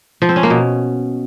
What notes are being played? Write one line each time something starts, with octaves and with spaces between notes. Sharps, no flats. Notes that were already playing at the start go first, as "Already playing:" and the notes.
F3
C4
C#4
A#3
B2